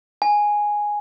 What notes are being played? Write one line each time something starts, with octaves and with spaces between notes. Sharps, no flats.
G#5